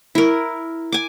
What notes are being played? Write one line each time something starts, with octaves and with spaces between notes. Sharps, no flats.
E4 A#4
G#5 D6